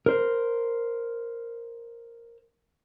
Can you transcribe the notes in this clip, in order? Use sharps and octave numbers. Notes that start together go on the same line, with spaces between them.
A#4 C5